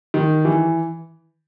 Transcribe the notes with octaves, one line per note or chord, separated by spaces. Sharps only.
D#3
E3